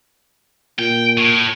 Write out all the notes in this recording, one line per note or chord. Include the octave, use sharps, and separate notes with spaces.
A#2 G5
A2